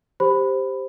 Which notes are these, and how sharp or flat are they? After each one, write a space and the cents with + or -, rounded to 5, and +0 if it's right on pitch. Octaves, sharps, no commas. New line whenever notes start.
G4 +0 C5 +0 B5 +10